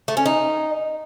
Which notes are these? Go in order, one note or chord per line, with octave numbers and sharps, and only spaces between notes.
A3
C#4
D#4